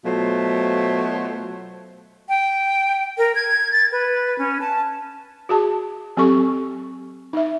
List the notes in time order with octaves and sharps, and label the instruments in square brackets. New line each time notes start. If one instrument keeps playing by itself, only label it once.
[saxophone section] B2 F#3 A3 F4 C5
[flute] G5
A#4
G#6
A6
B4
C#4
A5
[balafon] F#4 G#4 A5
F#3 C4 G4 A4 C#6
D#4 E5